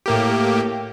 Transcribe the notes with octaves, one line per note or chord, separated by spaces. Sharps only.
A2 A#3 G4